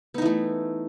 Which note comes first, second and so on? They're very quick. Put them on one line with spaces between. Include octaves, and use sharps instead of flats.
B3 D#4 E3 A3